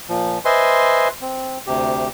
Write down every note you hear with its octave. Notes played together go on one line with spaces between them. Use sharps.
A#2 F3
B4 C5 D#5 E5 G#5 C6
C4
D2 C3 G4